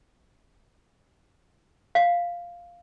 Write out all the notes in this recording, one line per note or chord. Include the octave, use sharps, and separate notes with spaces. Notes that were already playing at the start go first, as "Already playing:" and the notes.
F5